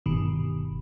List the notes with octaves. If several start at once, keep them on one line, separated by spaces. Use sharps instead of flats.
G1 B2 D#3